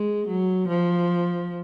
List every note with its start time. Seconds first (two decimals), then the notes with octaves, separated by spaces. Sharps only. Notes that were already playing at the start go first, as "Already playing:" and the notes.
Already playing: G#3
0.28 F#3
0.68 F3